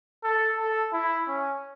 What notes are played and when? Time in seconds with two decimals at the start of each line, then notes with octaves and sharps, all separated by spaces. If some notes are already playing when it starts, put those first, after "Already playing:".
0.23 A4
0.59 A4
0.93 E4
1.28 C#4